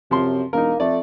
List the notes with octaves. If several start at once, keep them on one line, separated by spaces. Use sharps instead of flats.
F#2 C3 F3 C6
E1 A#3 D#4 A#4
F2 A3 D5